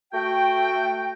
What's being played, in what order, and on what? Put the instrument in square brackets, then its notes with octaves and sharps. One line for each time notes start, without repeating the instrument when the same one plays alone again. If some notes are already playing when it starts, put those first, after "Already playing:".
[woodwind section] A3 F#4 G5